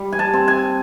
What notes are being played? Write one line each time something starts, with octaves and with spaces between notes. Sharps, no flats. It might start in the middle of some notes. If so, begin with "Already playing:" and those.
Already playing: G3
G#5
A5
C4
G#5